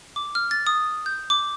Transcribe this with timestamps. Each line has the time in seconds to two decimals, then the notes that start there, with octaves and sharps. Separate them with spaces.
0.16 D6
0.35 F6
0.51 A6
0.67 D#6
1.06 G6
1.30 D6